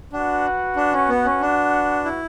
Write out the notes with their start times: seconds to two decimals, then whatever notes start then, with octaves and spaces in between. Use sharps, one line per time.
0.13 D4 F#4 B4 F#5
0.76 D4
0.93 C#4
1.09 B3
1.25 C#4
1.41 D4
2.05 E4